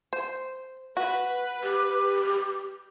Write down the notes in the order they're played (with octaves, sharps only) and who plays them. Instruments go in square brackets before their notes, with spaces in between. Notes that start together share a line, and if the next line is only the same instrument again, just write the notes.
[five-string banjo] C5
[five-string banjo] F#4 [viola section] B4
[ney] G4